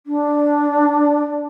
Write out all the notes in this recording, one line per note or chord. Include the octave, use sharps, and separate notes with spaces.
D4